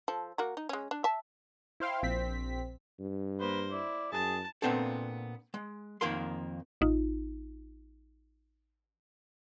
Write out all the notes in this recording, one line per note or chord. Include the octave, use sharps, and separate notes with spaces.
F3 A4
A#3 F#4 A#4
D#4
G#3 C#4
D4
E5 A5
E4 C5 F5 G5 C6
A#1 C4 B6
G2
A#3 B4 C5
E4 D5
F#2 G#4 A5
A#2 E3 B3 C4 D4 A4
G#3
F2 D#3 A#3 A#4 C6
A1 D#4 F4